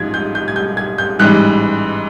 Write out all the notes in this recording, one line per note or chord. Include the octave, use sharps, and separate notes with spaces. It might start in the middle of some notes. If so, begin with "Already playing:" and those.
Already playing: A1 G#2 F3 G#6
G6
G6
G#6
G6
G#6
G6
A1 G#2 E3 G3 F#6